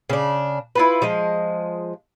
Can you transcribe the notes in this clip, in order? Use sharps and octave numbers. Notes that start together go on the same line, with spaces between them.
C#3 D4
E4 F4 B4
F3 G#3 D#5